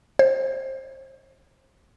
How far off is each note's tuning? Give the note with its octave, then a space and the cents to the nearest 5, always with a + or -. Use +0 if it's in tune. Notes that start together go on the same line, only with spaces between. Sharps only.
C5 +25